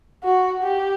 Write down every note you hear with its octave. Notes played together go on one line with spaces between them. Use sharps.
F#4
G4